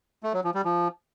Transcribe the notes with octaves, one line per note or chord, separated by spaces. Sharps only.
A3
F#3
F3
G3
F3